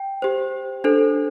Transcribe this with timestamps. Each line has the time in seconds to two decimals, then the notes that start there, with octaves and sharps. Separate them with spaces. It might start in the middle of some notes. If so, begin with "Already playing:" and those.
Already playing: G5
0.22 G4 C5
0.84 D4 A4 C5